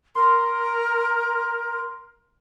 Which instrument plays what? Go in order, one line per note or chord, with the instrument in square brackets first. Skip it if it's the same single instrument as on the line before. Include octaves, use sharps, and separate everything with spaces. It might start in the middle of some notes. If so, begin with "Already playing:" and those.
[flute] A#4 [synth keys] C6